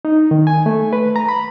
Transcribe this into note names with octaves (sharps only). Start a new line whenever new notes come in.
D#4
D#3
G#5
A3
B4
A#5
B5